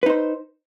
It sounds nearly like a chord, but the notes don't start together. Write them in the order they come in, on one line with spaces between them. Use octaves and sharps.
B4 D#4 C5